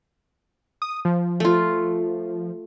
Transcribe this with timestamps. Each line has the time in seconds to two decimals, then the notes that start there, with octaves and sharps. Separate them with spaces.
0.82 D#6
1.05 F3
1.40 A3 F4